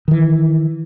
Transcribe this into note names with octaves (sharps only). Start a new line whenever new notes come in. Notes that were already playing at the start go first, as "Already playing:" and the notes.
D#3 E3